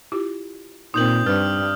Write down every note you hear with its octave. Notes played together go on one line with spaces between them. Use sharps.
E4 F4 G4
A#2 C4 D#4 A#4 D#6 G6 F#7
G2 B4 F6